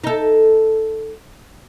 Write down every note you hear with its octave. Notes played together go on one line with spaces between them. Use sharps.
D#4 A4